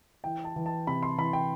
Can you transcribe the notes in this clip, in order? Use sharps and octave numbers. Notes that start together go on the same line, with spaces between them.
E3 G5
A5
E3
A5
C3 B5
C6
E3 B5
G5